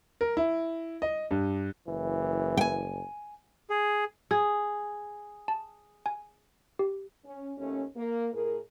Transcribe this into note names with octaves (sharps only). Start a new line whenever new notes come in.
A#4
E4
D#5
G2
F#1 E3
G5 G#5
G#4
G#4 D#6 G#6
A5
G#5
G4
C#4
D#2 A3 C#4
A#3
A2 G#4 A#4